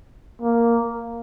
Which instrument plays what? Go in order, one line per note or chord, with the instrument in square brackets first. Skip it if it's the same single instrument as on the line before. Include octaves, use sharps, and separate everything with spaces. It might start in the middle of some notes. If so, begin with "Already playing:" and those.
[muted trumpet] A#3